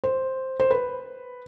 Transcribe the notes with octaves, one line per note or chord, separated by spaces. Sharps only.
C5
C5
B4